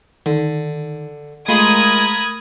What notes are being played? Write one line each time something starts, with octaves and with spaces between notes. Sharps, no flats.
D3 D#3
G#3 A3 F4 A#4 B5 D#6 G#6